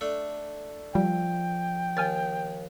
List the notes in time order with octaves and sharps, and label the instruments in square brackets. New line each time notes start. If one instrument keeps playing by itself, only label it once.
[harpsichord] A3 D4 A4
[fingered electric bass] F3 [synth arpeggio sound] G3 [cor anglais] G5
[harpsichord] D#2 [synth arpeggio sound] G#5 F6 A6